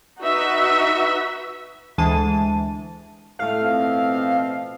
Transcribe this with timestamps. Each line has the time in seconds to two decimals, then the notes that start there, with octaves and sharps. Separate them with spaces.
0.20 D#4 F#4 B4 E5
1.98 D2 E3 G#3 A5 D#7
3.39 A2 A3 F5
3.61 B2 F3 C4